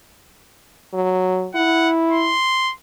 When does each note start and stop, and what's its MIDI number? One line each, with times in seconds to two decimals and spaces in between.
0.94 1.48 54
1.55 2.34 64
1.55 1.91 78
2.11 2.73 84